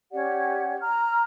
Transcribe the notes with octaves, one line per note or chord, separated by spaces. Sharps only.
C#4 G4 D5 F#5
A#5 F6